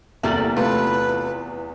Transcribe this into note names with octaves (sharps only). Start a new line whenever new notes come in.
E2 C3 G3 A3 A#3 A6 F#7
C3 A3 F4 B4